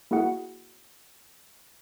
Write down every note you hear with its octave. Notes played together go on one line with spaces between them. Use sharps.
A#3 E4 F#4 G#4 F#5